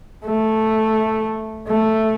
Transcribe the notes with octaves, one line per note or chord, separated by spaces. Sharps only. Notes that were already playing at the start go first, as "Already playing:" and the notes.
A3
A3